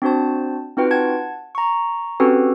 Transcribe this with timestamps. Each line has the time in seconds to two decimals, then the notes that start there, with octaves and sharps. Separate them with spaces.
0.02 C4 D4 F#4 C5 A5
0.77 C4 D#4 F4 F#4 B4 G5
0.91 F#5 A5 G#6
1.55 A#5 C#6
2.20 C4 C#4 F#4 G4 A4 B4